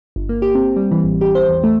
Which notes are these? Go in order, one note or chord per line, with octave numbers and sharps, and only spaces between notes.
G1
A#3
G4
C4
G3
E3
A1
G4
C5
E2
A3